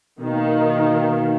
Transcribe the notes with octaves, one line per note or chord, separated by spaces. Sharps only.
B2 D#3 A#3 D#4